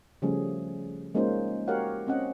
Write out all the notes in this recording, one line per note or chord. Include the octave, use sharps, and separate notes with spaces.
C#3 F3 G3 A3 C#4 G#4
G#3 A#3 C#4 D#4 F4 C5
F#4 G4 A#4 C#5 F5 F#5
C4 C#4 D#5 F#5